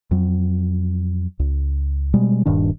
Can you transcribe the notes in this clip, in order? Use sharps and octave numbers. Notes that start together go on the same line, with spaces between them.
F2 F#3
C#2
B2 G3 G#3
D#1 G2 D#3 D4